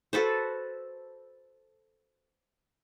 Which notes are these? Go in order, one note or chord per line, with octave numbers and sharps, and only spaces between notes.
F#4 A4 B4 C5